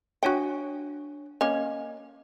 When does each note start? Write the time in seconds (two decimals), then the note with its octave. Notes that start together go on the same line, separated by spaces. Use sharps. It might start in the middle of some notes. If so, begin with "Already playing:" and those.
0.23 D4 F#4 C#5 G5 G#5
1.41 A#3 C#4 D#5